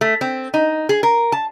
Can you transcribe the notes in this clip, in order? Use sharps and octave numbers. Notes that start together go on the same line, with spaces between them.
A3
C4
D#4
G#4
A#4
A5